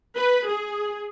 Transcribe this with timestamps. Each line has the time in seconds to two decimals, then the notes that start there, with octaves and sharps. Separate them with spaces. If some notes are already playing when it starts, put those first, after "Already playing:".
0.17 B4
0.50 G#4